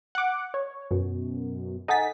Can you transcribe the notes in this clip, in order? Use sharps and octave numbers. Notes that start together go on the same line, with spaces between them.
F#5 D6
C#5
F#2 B2
D#4 A4 F#5 G#5 A6 B6